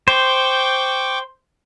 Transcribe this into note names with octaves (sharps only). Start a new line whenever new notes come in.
C5 G5 C#6 D6